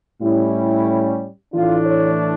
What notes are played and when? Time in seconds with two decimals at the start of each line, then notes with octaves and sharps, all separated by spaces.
0.21 A2 G3 C#4 E4
1.53 A2 E3 A3 D4 F4
1.86 C#5